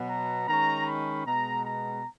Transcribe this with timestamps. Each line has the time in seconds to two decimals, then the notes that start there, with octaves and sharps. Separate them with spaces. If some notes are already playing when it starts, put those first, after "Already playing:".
Already playing: B2 F#3 B3
0.09 A#5
0.48 D#3 G#3 C#4 A#5
0.87 B5
1.26 B2 G#3 B3 A#5
1.65 A#5